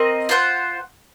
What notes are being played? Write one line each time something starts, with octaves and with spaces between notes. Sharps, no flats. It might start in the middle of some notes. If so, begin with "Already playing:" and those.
Already playing: C4 A#4 D#5
F4 C5 F#5